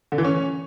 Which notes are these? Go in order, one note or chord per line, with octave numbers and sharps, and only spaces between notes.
D3
E3
C#4